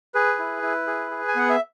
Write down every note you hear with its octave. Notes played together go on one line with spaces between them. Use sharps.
G#4 B4
E4
E4
G#4
G#4
G#5
B3 F#5
E5